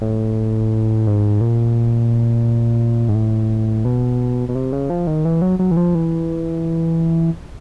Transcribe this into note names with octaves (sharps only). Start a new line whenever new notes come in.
A2
G#2
A#2
G#2
A2
B2
B2
C3
C#3
F3
D#3
E3
F#3
F#3
E3
F3
E3